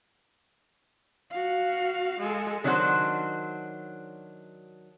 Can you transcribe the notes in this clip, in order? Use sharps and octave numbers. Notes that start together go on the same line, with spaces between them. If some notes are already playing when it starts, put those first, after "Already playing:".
F#4 F5
G#3 A4
D#3 F#3 D4 F4 F#4 C5